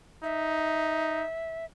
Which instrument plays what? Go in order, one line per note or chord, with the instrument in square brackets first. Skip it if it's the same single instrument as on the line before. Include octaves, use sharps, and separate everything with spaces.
[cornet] D#4 [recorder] E5